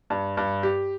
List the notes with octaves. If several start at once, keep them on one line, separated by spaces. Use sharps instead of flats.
G2
G2
G4